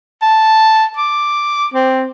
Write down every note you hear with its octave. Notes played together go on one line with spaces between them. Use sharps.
A5
D6
C4